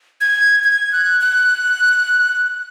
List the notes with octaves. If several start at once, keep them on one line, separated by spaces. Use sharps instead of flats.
G#6
G#6
F#6
F#6